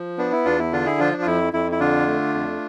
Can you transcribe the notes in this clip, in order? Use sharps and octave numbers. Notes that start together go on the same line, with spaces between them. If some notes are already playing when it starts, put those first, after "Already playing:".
Already playing: F3
B3 D4
E4
E2 D4 F4
E4
D3 D4 F4
E4 G#4
F3 D4 F4
D4
F4
F2 E4
F2 E4
E4
D3 D4 F4
A3
F2